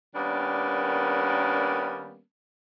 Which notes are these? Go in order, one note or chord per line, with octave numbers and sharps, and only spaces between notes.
D#3 G3 A#3 B3 C#4 D4